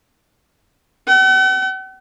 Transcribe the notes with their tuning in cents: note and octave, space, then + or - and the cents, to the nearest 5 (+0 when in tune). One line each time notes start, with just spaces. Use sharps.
F#5 +45